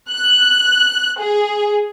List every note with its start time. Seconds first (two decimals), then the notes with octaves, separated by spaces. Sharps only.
0.11 F#6
1.20 G#4